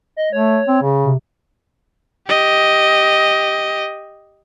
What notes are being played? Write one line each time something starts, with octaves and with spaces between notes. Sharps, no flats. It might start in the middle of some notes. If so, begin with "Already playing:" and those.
D#5
A3 C#5
C4
C#3
C3
G4 D#5